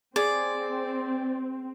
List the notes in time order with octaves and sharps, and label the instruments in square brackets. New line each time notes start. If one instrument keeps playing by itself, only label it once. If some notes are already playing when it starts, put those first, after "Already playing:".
[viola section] C4 [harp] G#4 [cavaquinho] D5